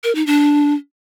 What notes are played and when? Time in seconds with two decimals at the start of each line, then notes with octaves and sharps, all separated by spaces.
0.04 A#4
0.15 D#4
0.26 D4